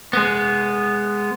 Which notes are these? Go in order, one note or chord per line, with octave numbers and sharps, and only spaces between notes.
G#3 B3